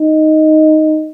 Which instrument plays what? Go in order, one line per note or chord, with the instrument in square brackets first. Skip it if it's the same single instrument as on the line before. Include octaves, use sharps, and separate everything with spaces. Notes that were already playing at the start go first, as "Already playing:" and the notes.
Already playing: [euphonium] D#4